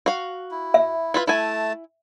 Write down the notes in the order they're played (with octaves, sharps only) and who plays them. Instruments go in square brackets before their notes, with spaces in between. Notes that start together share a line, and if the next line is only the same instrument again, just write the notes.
[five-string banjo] F#4 F5
[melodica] E4
[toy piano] E5
[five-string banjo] E4 F4 B4
[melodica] A3 A5 [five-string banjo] E4 G#5